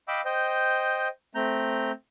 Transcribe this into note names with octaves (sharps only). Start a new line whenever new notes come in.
D#5 F5 G5 B5 D6 E6
C5 D#5 G5
A3 C4 A#5 G6